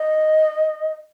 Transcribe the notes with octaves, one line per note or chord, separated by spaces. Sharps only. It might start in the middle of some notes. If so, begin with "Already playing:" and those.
Already playing: D#5